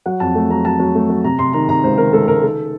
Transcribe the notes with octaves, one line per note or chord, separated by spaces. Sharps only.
F#3 F#5
F2 A5
A3
F#3 A#5
F#3 A5
F#3
A3
F#3
C3 A#5
C3 C6
D#3 A#5
C3 A#5
C#2 C5
D#3 A#4
C#2 A4
C#2 A#4
D#3 A4